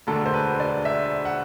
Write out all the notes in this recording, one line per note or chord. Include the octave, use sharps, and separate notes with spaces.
E1 D2 D3 A4
C5
B4
D5
E5
F#5